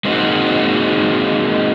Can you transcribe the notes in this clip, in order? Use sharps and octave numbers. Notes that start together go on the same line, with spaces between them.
G#3 A#3 C4 D#4 E4 F#4